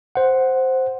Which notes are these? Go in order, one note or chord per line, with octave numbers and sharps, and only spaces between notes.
C5 F#5